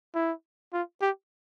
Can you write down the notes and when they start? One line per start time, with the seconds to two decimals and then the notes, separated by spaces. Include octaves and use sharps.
0.15 E4
0.73 F4
1.01 G4